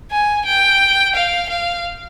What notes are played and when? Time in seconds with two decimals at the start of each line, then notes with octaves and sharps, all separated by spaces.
0.11 G#5
0.46 G5
1.15 F5
1.49 F5